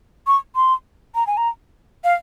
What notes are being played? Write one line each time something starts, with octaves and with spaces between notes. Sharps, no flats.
C#6
C6
A#5
G#5
A#5
F5